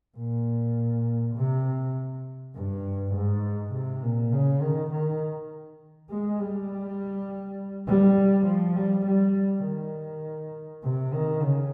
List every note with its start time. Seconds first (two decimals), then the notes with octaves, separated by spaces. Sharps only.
0.17 A#2
1.36 C3
2.54 G2
3.14 G#2
3.73 C3
4.03 A#2
4.32 C#3
4.62 D#3
4.90 D#3
6.09 G#3
6.39 G3
7.87 G3
8.46 F3
8.76 G3
9.06 G3
9.64 D#3
10.83 C3
11.13 D#3
11.42 C#3